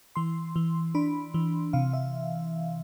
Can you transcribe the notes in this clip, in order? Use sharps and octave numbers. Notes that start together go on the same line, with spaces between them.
E3 C6
E3
D4 B5
E3
C3 F5
E5